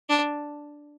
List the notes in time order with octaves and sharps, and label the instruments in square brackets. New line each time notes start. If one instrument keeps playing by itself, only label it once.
[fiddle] D4